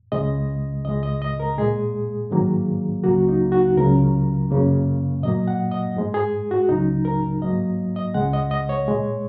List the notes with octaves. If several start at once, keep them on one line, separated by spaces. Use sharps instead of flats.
C#2 C#3 G#3 D#5
C#2 C#3 G#3 D#5
D#5
D#5
A#4
A#2 G#3 G#4
G#2 D#3 F#3 A#3
C#2 C#3 F#3 A#3 F#4
D#4
F#4
C#2 C#3 F#3 A#4
F#2 C#3 A#3
A#2 F#3 A#3 D#5
F#5
D#5
G#2 G#3
G#4
F#4
C#2 C#3 F#3 D#4
A#4
G#2 F#3 A#3 D#5
D#5
C#2 C#3 G#3 F#5
D#5
D#5
C#5
A#2 G#3